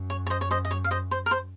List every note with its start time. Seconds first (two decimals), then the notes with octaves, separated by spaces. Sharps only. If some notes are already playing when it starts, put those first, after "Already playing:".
Already playing: F#2
0.10 C#5
0.27 C#5
0.30 C5 D#5
0.41 C#5
0.51 C5 D#5
0.65 D#5
0.71 C#5
0.84 F5
0.91 C5 D#5
1.11 C5
1.26 A#4
1.31 C5